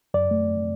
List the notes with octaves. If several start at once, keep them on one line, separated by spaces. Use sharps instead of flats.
F#2 D5
A3
F#2